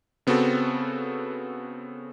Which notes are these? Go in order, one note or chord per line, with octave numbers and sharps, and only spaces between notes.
C#3 B3 C4 F#4 A4